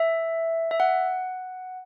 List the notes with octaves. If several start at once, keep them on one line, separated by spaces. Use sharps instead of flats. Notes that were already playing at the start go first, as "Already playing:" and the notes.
Already playing: E5
E5
F#5